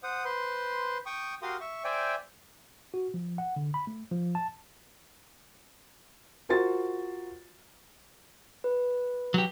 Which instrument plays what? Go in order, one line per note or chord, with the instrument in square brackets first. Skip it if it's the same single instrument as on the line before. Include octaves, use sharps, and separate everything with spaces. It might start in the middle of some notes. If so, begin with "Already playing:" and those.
[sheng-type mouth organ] C5 F#5 D#6
B4 C5 C6
G5 C#6 D#6
F#4 G4 A#4 F5 C6 D#6
E5 C#6
C5 D5 E5 G5 G#5
[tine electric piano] F#4
F3
F#5
D3
B5
A3
F3
A5
[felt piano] F4 F#4 A#4 C5 C6 A6
[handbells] B4
[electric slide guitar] F#3 G4